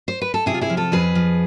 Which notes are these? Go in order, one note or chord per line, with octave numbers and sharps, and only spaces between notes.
C5
B4
A4
C3 E4 G#4
F4
E4 G#4
F3
F4 A4
F2 G#4 B4
F3